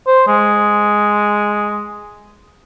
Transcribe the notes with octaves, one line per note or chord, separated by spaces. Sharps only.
C5
G#3